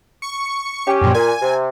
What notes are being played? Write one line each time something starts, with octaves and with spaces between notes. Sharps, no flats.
C#6 C#7
C#4 G4
F#2 A#2 F3
A#2 G#5
C3